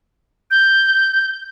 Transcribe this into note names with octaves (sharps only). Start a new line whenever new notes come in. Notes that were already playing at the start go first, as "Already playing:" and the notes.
G6